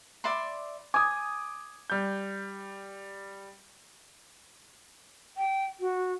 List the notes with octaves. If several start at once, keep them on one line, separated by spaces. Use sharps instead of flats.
D5 E5 B5 C6
G#5 D6 D#6
G3 G6
G5
F#4